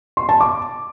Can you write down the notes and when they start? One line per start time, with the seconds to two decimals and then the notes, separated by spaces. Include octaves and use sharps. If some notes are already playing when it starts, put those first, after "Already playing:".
0.17 C6
0.29 A5
0.40 D6